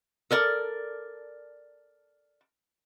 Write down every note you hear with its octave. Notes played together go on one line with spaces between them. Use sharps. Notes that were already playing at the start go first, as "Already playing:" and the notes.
A4 A#4 D5